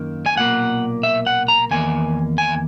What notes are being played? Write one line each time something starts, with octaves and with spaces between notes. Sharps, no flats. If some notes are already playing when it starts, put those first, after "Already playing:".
Already playing: F#2 D#3 A#3
G#5
B1 A#2 A#3 F#5
E5
F#5
A#5
E2 D#3 A#3 G#5
G#5